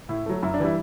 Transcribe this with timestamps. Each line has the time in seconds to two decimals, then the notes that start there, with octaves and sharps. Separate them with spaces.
0.09 A2 E4
0.26 F#3 A3
0.43 F#2 E4
0.54 D4
0.60 E3 G3 E4